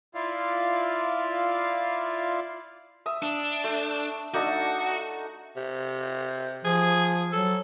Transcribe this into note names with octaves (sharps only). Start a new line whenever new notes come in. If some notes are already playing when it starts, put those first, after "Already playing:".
E4 F4 D5 F5
E5 D#6
D4
A3
A3 D4 D#4 F#4
C3
F3 G#4
F#3 A4